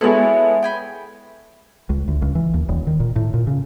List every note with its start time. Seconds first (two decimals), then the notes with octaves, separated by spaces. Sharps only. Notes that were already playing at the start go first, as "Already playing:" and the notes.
0.01 G#3 B3 E4 A4 C#5
0.63 G5 G#5 B5
1.89 C#2
2.08 D2
2.22 C#2
2.35 E3
2.54 D#2
2.69 D#1
2.87 D#3
3.00 A#2
3.16 A2
3.34 A#2
3.47 C#3